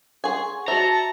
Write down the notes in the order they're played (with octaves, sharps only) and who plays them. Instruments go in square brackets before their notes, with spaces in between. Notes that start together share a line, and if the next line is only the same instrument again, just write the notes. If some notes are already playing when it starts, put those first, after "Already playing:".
[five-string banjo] G#4 G#5 [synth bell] F#5 C6 C#6
[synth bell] F#4 C5 [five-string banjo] E5 [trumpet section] A5 [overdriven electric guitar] A#5